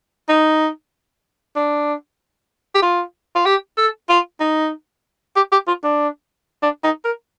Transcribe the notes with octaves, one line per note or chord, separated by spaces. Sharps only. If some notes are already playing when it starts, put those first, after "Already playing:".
D#4
D4
G4
F4
F4
G4
A4
F4
D#4
G4
G4
F4
D4
D4
D#4
A#4